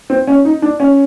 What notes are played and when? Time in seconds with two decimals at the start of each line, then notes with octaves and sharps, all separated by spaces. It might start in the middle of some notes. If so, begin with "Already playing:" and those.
0.10 C4
0.27 C#4
0.45 D#4
0.62 D4
0.80 C#4